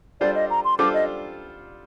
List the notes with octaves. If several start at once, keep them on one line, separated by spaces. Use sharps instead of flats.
G3 D4 F4 A4 C5 D5
D#5
A#5
C6
G3 D4 F4 A4 C5 D6
D#5